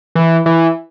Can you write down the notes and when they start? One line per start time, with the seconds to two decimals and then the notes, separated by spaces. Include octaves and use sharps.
0.15 E3
0.46 E3